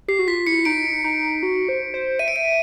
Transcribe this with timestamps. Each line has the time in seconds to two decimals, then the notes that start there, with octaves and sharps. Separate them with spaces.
0.08 G4 C7
0.19 F#4
0.28 F4 B6
0.47 E4 C#7
0.65 D#4 D7
1.04 D#4
1.43 F#4
1.69 C5
1.94 C5
2.19 E5 D#7
2.28 D7
2.36 D#7